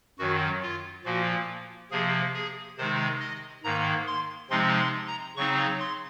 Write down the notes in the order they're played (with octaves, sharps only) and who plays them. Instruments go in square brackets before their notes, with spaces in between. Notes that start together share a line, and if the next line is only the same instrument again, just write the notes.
[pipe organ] F#2 D#3 F#3 F#4
F4
A#2 F3 A#3 F#4
C3 F3 A#3 G#4
G#4
C3 D#3 G#3 D#4 C5
D#5
G#2 D#3 A#3 A#5
C6
C3 F3 G#3 C4 D#4 C6
C6
A#5
C#3 F#3 C4 D#4 C#6
C6